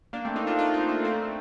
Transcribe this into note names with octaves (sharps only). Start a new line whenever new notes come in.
A#3 D4
A3 C4
C4 D#4
D4 F4
D4 F4
C4 D#4
A#3 D4
A3 C4